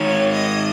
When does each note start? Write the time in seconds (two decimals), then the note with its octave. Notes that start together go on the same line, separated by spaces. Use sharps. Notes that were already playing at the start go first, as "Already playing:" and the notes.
Already playing: D#3 G#3 D#4 C#5
0.34 D#5